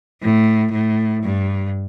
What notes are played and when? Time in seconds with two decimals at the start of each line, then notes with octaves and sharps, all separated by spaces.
0.22 A2
0.72 A2
1.22 G2